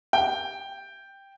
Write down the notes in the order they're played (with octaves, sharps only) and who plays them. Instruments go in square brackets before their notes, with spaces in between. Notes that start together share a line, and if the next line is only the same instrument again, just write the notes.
[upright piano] G5